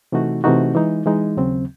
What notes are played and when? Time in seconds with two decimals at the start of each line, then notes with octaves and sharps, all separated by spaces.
0.12 C3 E3 A3 D#4 F#4
0.44 C3 E3 A3 D#4 F#4
0.75 E3 G#3 D#4
1.06 E3 G#3 D#4
1.37 D#2 C#3 F#3 C4